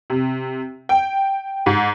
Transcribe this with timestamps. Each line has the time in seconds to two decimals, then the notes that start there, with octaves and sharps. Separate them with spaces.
0.10 C3
0.89 G5
1.66 G#2